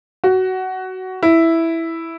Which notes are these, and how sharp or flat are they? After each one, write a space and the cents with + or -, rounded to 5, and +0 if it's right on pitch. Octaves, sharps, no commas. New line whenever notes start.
F#4 +15
E4 +0